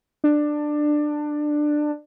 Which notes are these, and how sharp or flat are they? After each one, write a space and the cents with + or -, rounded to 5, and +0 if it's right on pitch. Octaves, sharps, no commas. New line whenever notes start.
D4 +15